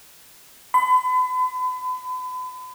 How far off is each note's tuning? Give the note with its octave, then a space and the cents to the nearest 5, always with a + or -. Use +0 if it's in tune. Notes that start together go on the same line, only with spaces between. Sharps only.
B5 +40